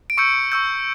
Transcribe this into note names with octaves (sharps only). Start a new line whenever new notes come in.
D7
C#6 E6 G6 C#7
C#6 E6 G6